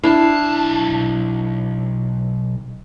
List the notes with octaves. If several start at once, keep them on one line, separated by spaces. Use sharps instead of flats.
B1 D4 E4 F5 A5